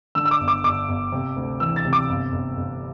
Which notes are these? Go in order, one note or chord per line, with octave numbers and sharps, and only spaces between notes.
D3 E6
E6
D6
G1
D6
G1 D6
G1
C3
D2
E3 E6
A6
C3
D6
G1
G1
G1